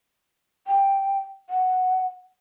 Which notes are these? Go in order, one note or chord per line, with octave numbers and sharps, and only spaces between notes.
G5
F#5